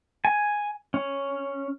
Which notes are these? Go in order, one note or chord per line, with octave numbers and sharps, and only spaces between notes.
G#5
C#4